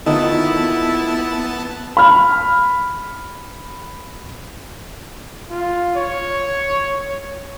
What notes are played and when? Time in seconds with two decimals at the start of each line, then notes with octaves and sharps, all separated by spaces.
0.06 D#3 A3 B3 E4 F4 D#5 A5
1.97 B5 F6
5.50 F4
5.96 C#5